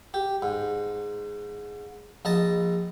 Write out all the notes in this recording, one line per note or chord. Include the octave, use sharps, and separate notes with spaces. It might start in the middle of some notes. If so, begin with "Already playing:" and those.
G4
G#2
A#1 D#5 A5